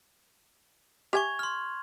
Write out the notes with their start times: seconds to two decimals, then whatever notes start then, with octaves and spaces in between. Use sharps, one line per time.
1.13 G4 E5 G#5 C#6 G#6 F7
1.39 C6 F6